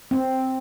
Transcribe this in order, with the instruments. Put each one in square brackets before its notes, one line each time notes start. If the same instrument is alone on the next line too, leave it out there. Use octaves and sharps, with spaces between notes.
[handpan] C4